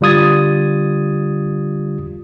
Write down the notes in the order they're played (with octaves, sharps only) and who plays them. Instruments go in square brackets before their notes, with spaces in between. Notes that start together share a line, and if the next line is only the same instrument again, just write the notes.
[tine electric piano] D3 G3 F4 D#6 G#6 A6